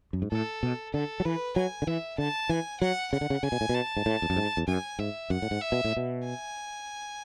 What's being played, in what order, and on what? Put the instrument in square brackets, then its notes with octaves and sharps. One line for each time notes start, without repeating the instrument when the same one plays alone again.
[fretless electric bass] F#2
G#2
[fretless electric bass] A2 [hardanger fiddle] A4
[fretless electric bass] B2
[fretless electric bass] D3 [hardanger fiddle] A4
[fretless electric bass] F#3
[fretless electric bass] E3 [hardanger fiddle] B4
[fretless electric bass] F#3 [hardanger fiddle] G#5
[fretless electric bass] D3
[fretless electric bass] E3 [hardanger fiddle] E5
[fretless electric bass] D3 [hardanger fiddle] A5
[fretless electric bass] E3 [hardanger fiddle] G#5
[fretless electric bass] F#3 [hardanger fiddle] F#5
[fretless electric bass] C#3 [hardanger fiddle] F#5
[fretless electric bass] D3
C#3
[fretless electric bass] C#3 [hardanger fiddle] G#5
[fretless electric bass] B2
A2
[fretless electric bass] B2 [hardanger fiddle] A5
[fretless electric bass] G#2
A2
E2
F#2
G#2
E2
[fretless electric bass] F#2 [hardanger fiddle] G#5
[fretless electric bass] G#2 [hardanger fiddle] E5
[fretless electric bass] F#2 [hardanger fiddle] F#5
[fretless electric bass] A2
G#2
[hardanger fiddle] E5
[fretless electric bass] B2
A2
B2
[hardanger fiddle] G#5